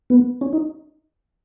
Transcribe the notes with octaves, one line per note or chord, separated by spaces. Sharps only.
B3
C#4
D#4